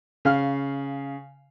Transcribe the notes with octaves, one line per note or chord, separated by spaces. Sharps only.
C#3 F5 F6